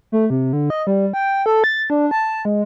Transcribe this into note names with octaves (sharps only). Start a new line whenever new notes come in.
A3
C3
D3
D#5
G3
G5
A4
A6
D4
A5
G#3